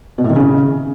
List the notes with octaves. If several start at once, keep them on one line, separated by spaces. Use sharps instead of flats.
B2
A2
D#3
C#3